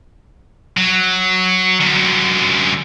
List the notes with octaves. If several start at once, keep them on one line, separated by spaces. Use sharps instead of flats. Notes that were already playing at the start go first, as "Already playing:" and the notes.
F#3
F#2 D3